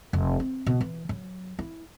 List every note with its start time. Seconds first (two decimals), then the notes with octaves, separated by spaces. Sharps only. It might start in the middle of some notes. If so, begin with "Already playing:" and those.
0.13 F1
0.40 C4
0.66 B2
0.81 E3
1.09 F#3
1.59 E4